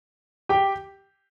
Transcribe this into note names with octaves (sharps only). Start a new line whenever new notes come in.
G4 G5